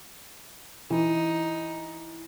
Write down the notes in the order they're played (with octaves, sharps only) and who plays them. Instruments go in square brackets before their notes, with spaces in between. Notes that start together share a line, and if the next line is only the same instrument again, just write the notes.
[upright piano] E3 [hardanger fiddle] D#4